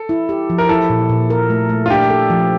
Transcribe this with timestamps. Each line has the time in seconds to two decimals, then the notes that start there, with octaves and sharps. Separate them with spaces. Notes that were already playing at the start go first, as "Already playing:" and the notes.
Already playing: A4
0.09 E4
0.29 G4
0.50 F3
0.58 A#4
0.69 E4 A4
0.90 A#2
1.09 A#2
1.30 A#4
1.50 A3
1.70 A3
1.86 F4
1.90 D4 G4
2.10 A4
2.30 F3